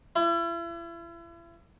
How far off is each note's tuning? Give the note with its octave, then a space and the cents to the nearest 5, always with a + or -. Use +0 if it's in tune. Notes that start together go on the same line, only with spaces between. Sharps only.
E4 +40